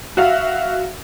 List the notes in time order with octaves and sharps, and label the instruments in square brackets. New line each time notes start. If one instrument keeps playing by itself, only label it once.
[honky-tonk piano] F#4 E5 F5